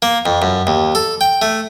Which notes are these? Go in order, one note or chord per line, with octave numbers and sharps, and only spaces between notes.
A#3
F2
F#2
D#2
A4
G5
A3